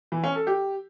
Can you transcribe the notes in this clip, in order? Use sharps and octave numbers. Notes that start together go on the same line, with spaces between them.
E3
C#4
A4
G4